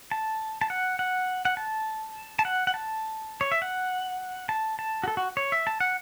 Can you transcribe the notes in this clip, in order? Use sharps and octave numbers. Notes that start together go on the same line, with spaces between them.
A5
A5
F#5
F#5
F#5
A5
A5
F#5
F#5
A5
C#5
E5
F#5
A5
A5
F#4
A4
F#4
C#5
E5
A5
F#5